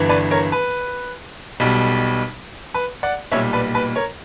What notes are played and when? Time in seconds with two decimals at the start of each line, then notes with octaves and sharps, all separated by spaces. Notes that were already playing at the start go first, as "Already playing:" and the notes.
Already playing: G1 G2 E3
0.09 B4 D5
0.31 A#4 C#5
0.52 B4
1.60 B1 B2 G3
2.74 B4
3.03 D5 F#5
3.32 B1 A#2 G3 C#5 E5
3.53 B4 D5
3.75 B4
3.96 A#4 C#5